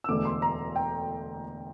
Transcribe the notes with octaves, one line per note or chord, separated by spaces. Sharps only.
E6
E1 D2 D3 D6
C6
A#5
G5